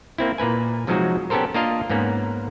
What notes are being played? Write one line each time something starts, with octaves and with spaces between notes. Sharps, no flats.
A#3 C4 E4
A#2 A#3 B4 G#5
C3 F3 F#3 G#3 D#4 F#4
B3 C#4 G4 A4 A#4 C5
A#3 D4 F4 A#4 D#5 F5
G#2 A#3 B3 C#4